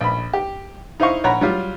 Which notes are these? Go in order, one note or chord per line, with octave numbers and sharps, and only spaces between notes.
A#1 B5
G4
D#4 E4 C5 D#5 F5 C#6
A#1 C#5 F#5 A#5 B5
F#3 G3 F4